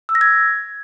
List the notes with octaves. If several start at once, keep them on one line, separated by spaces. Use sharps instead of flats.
E6
A#6
G#6